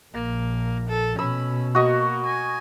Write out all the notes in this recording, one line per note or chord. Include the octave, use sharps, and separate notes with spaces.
A#1 A#3
A4
B2 C#4 B5 E6
A#3 F#4 D#5 C#6
G#5